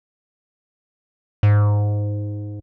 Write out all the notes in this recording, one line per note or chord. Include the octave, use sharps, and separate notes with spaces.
G#2